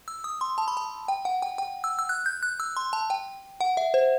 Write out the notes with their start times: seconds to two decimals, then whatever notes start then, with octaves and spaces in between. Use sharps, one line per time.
0.08 E6
0.24 D#6
0.41 C6
0.58 A5
0.68 B5
0.77 A5
1.08 G5
1.25 F#5
1.42 G5
1.58 G5
1.84 E6
1.99 E6
2.09 F#6
2.26 G6
2.43 F#6
2.60 E6
2.77 C6
2.93 A5
3.10 G5
3.61 F#5
3.77 E5
3.94 C5